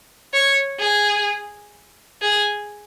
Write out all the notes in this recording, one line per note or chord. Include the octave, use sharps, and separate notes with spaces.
C#5
G#4
G#4